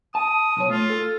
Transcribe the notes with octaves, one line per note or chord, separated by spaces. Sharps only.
A5 D#6
B1 C#5
A3 F4
A4